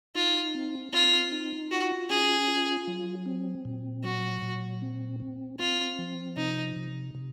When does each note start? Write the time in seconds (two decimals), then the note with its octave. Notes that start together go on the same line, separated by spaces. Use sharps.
0.15 D#4 F4
0.55 C4
0.93 C4 F4
1.32 D#4
1.71 F4 F#4
2.10 C#4 G#4
2.48 F4
2.88 F#3
3.26 C4
3.65 A#2
4.04 F#3 F#4
4.42 A#2
4.82 C4
5.20 C4
5.60 C4 F4
5.99 F3
6.37 C3 D#4
6.76 C3
7.15 C3